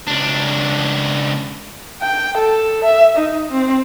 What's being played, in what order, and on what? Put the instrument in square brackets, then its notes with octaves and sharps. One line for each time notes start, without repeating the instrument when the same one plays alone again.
[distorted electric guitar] C#2 D4
[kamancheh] G5
A4
E5
D#4
C4